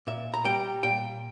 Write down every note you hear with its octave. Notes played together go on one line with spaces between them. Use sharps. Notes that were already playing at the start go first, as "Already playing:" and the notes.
A#2 E5
A#5
G3 G5
A#2 G5